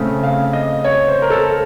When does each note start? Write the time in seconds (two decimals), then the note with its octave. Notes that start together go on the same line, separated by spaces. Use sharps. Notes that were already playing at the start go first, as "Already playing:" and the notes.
Already playing: C#3 A3 C4
0.23 F5
0.53 D#5
0.84 C#5
1.08 C5
1.22 A#4
1.30 A4